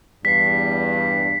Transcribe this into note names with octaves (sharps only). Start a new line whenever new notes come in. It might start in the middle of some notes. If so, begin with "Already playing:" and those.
E2 G2 B6 C7